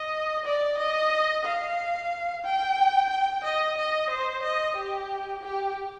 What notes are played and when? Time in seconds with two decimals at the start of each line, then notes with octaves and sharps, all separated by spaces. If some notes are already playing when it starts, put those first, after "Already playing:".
Already playing: D#5
0.46 D5
0.78 D#5
1.45 F5
2.45 G5
3.10 G5
3.44 D#5
3.77 D#5
4.10 C5
4.43 D#5
4.76 G4
5.43 G4